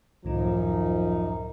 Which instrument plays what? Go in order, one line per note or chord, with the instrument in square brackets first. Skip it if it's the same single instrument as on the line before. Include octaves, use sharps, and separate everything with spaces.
[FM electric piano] C#2 A2 D#3 [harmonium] F#2 D#4 [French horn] F3